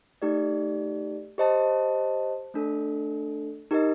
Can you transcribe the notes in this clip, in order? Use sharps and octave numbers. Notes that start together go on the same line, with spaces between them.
A3 D#4 G4 D5
G4 C5 D#5 A5
A3 D4 A4
D#4 G4 A#4 D#5